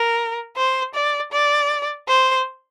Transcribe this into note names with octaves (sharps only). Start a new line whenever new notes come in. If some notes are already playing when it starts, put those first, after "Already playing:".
Already playing: A#4
C5
D5
D5
C5